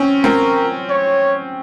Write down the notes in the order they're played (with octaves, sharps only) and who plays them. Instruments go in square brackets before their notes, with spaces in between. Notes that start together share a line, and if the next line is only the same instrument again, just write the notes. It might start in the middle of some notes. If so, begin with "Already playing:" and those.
Already playing: [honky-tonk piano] C4 C#4
[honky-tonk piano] C4 [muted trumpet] A#4
[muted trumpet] C#5